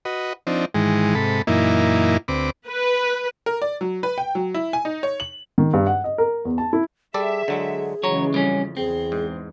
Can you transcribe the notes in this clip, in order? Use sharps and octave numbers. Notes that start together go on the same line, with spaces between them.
F#4 B4 D#5
F3 C4 D4 D#4
G#2 D#3 E3 G#3
G#2 C3 A4 B5
F#2 A#2 E3 A#3 D#4 E4
D2 C4 B4 D6
B4
A#4
D5
F#3
B4
G5
F#3
E4
G#5
D#4
C#5
F#7
D#3
G2
F#5
D#5
A#4
E2
A5
E4
G3 G#4 A4 D5 E5
D3 F#3 G#3
C#3 E3 F#3 G#3 C#5 A#5
F2 G3 C#4
E2 C4 G#4
G#2